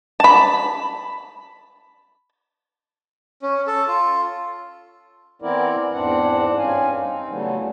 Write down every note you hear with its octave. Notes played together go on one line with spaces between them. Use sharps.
A5 B5
C#4
A4
F4
E3 B3 C4 E4 A#4 D5
E2 G#2 C4 D4 D5 F#5
G2 C4 C#4 F5 G#5
C4 D#4
C#3 E3 F#3 G3 A3 B3
D2